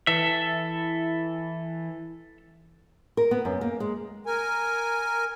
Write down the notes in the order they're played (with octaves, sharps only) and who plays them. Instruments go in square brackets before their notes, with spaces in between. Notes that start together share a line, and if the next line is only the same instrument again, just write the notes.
[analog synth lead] E3 [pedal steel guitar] A4 E5
[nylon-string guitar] A#4
B3
F#2
A#3
G#3
[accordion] A#4 G#5